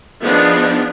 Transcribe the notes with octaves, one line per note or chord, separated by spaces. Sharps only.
F3 B3 D4 D#4 G#4